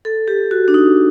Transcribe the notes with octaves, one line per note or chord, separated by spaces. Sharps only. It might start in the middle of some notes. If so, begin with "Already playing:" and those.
A4
G4
F#4
D4
D#4